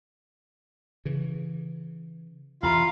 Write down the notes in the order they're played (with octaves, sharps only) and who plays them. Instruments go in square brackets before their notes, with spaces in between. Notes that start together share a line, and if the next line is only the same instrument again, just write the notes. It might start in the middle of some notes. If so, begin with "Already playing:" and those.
[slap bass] C#3 E3
[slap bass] E2 C3 E3 [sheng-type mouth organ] F4 F5 [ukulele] E5 A#5 B5